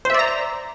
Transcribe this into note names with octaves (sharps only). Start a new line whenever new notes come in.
C5 D5 E5 A#5